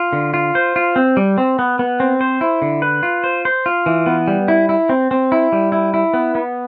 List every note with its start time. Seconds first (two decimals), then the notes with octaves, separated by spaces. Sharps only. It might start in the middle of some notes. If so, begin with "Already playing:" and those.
Already playing: F4
0.13 D3
0.34 F4
0.55 C5
0.76 F4
0.96 C4
1.17 G3
1.38 C4
1.59 B3
1.79 B3
2.00 C4
2.21 C5
2.41 E4
2.62 D3
2.82 B4
3.03 F4
3.24 C5
3.45 C5
3.66 F4
3.86 E3
4.07 B3
4.28 G3
4.48 E4
4.69 E4
4.89 C4
5.11 C4
5.32 E4
5.52 G3
5.72 E4
5.94 E4
6.14 B3
6.35 B3